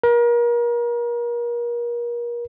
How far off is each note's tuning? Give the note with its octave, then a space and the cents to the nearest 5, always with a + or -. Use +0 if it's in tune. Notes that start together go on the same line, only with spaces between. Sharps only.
A#4 +35